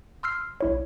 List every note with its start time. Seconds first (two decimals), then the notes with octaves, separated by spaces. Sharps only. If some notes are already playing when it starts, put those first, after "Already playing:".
0.23 C6 E6 F6 C7
0.61 B1 E4 C#5